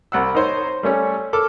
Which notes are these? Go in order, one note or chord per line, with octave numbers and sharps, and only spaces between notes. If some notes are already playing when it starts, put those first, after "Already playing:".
C2 F#5 E6
D#4 C5 C#5
G3 A3 C#4 C#5
A4 D6 F6